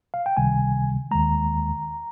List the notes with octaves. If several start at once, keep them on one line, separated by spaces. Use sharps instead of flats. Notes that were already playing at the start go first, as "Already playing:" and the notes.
F5
G5
C#2 C3 D#3 G3 G#5
D#2 D#3 G#3 A#5